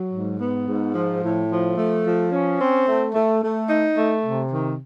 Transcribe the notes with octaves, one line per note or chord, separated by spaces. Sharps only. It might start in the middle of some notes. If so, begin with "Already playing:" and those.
Already playing: F#3
G#2
B3
G#2
F3
A2
F3
A3
F3
C#4
C4
A3
A3
A3
D#4
A3
C3
D#3